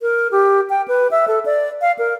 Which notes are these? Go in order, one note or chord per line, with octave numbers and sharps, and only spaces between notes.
A#4
G4
G5
B4
E5
A4
D5
F5
A#4